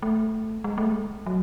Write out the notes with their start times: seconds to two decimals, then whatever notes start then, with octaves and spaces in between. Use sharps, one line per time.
0.02 A3
0.64 G#3
0.78 A3
0.92 G#3
1.26 F#3